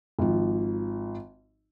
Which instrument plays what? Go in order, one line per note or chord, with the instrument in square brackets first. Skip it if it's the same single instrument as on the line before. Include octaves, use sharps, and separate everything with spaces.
[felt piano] G#1 F3